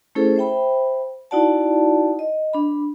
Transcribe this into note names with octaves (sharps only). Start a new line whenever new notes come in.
A3 C#4 E4 G#4 A4 C5
C5 E5 G5 B5
D#4 E4 F#4 D5 F#5 A5
D#5
D4 B5